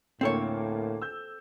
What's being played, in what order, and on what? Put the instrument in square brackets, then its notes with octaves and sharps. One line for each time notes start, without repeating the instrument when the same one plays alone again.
[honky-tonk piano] D2 A#3 [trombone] A2 [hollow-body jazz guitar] C4 A4 C#5
[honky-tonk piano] E6 G6